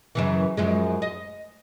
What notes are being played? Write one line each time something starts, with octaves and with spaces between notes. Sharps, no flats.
F#2 C#3 E3
F#2 F3 G#3
D#5